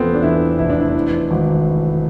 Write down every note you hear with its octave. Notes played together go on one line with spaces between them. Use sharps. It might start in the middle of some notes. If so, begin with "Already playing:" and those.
Already playing: E2 F3 A3 B3 C4
D4
E2 E4
F1 E4
D4
E4
E3
G#1